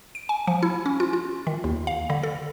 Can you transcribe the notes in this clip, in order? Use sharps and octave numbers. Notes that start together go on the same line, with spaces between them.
D7
G#5
F3
E4
C#4
F4
F4
D#3
D#2
F5
D3
A4